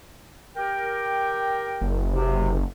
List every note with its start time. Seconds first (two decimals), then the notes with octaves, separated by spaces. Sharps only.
0.56 G4 A#4 G5
1.81 F#1
2.12 C3